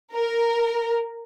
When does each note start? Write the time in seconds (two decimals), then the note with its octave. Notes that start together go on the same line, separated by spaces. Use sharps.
0.14 A#4